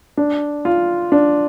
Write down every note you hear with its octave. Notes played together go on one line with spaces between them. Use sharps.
D4
F4
D4